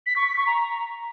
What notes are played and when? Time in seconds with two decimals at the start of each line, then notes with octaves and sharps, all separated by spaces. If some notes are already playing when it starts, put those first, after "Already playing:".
0.06 B6
0.16 C#6
0.27 B6
0.37 C#6
0.47 A#5